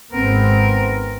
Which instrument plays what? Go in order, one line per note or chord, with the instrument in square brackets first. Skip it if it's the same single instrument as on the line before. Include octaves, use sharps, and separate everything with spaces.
[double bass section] G#1 B3 C4 [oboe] A#4